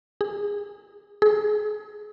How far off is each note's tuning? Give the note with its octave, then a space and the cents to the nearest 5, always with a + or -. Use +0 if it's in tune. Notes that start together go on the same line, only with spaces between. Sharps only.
G#4 -20
G#4 +30